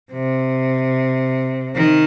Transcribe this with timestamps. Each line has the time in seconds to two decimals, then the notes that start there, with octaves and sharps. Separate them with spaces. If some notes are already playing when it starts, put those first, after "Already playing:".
0.13 C3
1.75 D#3